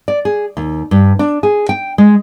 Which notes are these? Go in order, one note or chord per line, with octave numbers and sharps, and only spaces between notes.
D5
G#4
D#2
G2
D4
G#4
G5
G#3